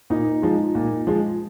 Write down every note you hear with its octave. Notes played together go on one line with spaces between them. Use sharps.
A#2 D#4
F3 G#3
A#2
F3 G#3